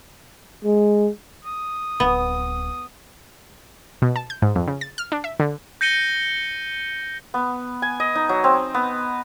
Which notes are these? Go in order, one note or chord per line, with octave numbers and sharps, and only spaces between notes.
G#3
D#6
D1 B3
B2
A5
G6
G#2
F2
C#3
A6
F6
D4
E5
D3
G6 A#6 C#7 D#7 G7
B3
G#5
D#5
D#4
F#3
C4
B3